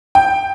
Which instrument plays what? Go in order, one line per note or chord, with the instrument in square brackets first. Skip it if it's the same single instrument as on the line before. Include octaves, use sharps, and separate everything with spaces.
[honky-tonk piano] G5